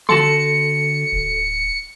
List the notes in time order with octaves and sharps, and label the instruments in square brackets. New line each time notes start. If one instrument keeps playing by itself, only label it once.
[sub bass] D3 [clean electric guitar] F#4 A5 C6 [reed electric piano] A4 [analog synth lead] C#7
[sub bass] D1